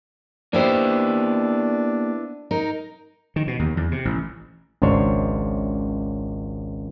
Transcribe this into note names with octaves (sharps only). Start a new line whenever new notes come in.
A#3 B3 D4 E4 G4 C5
D#4 A#4
D#3
B2
D#2
E2
C3
A1
G#1 C#2 D4 C5 C#5